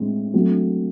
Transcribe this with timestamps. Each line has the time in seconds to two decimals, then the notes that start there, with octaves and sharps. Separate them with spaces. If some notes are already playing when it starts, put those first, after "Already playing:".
Already playing: A2 G#3 C4 E4
0.33 F#3 A3 C4